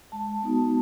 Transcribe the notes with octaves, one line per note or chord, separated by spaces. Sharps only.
G#3 A5
B3 D#4 F#4